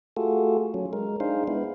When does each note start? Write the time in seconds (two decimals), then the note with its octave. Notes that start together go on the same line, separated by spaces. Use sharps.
0.17 A3 F4 F#4 G#4 A4
0.74 F#3 C#4
0.93 G#3 A#4
1.20 D4 D#4 G#4 C5 F5
1.48 G#3 B3 E4